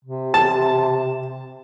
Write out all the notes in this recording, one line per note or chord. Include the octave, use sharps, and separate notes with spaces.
C3
A5